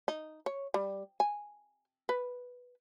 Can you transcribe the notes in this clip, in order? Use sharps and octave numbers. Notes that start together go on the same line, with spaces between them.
D#4
C#5
G3
G#5
B4